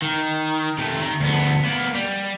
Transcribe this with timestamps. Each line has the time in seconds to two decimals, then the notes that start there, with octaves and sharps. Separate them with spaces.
0.02 D#3
0.78 C3 A3
0.99 D#3
1.20 D2 B3
1.65 A#3 B3
1.95 G3